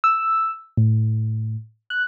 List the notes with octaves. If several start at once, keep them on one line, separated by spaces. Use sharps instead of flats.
E6
A2
F#6